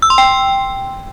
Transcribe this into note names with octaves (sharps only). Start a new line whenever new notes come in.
E6
C6
G5